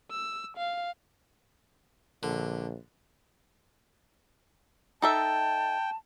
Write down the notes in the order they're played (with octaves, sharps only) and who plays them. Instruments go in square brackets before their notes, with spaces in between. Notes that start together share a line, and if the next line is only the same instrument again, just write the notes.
[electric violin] E6
F5
[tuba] A#1 [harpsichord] D3
[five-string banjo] D#4 A4 E5 [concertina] G5 [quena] A5